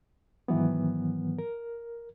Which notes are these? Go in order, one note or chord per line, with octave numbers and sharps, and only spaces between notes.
G#2 D#3 E3 F#3 B3
A#4